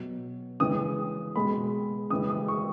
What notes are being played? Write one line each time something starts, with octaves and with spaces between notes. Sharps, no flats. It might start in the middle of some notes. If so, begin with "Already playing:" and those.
Already playing: B2 F#3
C#3 E3 G#3 D#6
B2 G#3 B5
C#3 E3 G#3 D#6
D#6
C#6